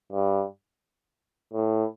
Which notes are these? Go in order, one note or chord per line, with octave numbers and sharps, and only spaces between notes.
G2
A2